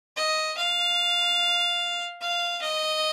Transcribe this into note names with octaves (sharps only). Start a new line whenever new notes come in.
D#5
F5
F5
D#5